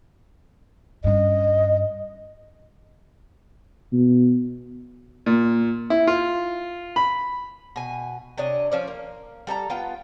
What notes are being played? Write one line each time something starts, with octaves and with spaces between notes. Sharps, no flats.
G2 C#4 D#5
B2
A#2
E4
F4
B5
B2 G#5
C3 D4 C#5 D#5
F3 C#4 D5
A#3
G3 A4 E5 A#5
B3 F4 G5